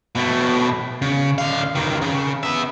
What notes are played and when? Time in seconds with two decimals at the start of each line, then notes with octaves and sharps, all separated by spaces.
0.15 B2 A3
1.02 C#3
1.38 D3 F5
1.75 C#2 D#3
2.02 C#3
2.43 B3 E5